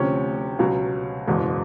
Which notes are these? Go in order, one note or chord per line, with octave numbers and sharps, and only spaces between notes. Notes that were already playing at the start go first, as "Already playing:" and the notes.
Already playing: D2 C3 F3 C#4
C#2 B2 F#3
F#1 E2 B2 G#3